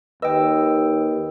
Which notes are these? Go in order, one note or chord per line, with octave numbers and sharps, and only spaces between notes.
D#2 B4 D#5 G5 E6